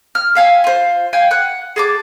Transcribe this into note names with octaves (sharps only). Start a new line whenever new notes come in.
F6
E5 F5 G#5
F4 C5
F5 G5 G#5
F#5 F#6
G#4 A5 D6